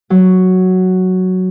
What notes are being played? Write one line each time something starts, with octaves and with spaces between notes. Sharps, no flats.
F#3